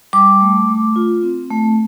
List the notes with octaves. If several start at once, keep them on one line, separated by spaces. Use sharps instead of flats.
G3 D6
A3
A3
F4
C4
A3